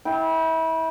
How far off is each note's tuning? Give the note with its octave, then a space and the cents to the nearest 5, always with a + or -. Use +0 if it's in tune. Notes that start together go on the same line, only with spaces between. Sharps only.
E4 -30 G5 +0